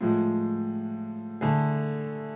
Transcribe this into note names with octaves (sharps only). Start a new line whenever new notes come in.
A2 F3 G#3
D3 A3 E4 G#4